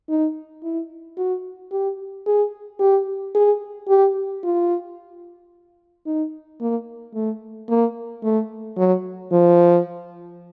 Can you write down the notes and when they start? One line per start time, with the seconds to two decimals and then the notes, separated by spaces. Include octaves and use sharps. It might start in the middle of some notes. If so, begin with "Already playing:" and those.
0.09 D#4
0.63 E4
1.17 F#4
1.72 G4
2.26 G#4
2.80 G4
3.35 G#4
3.89 G4
4.44 F4
6.06 D#4
6.61 A#3
7.14 A3
7.69 A#3
8.23 A3
8.77 F#3
9.32 F3